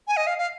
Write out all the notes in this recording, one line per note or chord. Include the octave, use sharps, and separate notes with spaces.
G#5
D#5
F5
F5